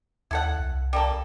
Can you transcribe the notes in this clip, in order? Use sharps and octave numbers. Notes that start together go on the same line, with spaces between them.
D#2 E4 A4 F#5
C2
G3 A#3 A4